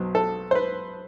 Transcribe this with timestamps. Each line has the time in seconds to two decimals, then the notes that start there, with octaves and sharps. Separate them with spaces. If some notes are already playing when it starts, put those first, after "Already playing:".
Already playing: B1 B2 F#3 C4
0.15 A4
0.51 C5
0.55 B4